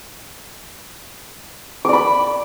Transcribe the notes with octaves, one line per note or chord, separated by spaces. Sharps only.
D5 B5 D6